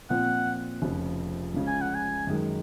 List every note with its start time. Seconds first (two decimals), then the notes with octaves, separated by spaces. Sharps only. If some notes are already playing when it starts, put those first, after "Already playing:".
0.10 A#2 F3 C4 F#5
0.82 F1 F2 C#3
1.54 C#2 C#3 F3
1.67 G#5
1.82 F#5
1.95 G#5
2.27 F#2 D#3 G#3